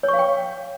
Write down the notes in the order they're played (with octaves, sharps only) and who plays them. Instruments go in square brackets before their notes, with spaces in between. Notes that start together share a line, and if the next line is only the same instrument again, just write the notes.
[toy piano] C#5
C#6
F5
G5